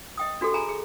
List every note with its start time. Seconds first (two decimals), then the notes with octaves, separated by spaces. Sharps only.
0.18 D#5 G5 D#6
0.41 D4 F#4 G4 A4
0.54 G#4 G#5 A#5 B5
0.69 G#4